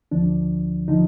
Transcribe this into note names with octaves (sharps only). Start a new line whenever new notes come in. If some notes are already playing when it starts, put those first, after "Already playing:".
D2 D3 F3 D4
D3 F3 D#4